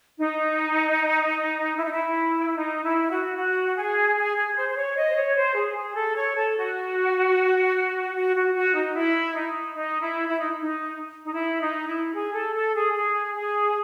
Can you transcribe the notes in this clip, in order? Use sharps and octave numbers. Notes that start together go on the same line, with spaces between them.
D#4
E4
D#4
E4
D#4
E4
F#4
F#4
G#4
G#4
G#4
C5
C5
C#5
D#5
C5
C#5
C5
G#4
G#4
A4
C#5
A4
F#4
F#4
F#4
F#4
D#4
E4
D#4
D#4
E4
E4
D#4
D#4
D#4
E4
D#4
E4
G#4
A4
A4
G#4
G#4
G#4